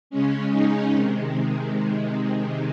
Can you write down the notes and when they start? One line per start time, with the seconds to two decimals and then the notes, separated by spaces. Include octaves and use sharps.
0.10 C#3 G#3 C#4
0.52 D#4
0.93 C3 D#3 G#3